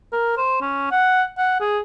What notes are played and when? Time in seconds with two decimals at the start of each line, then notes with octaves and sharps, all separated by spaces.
0.13 A#4
0.37 C5
0.61 C#4
0.91 F#5
1.38 F#5
1.60 G#4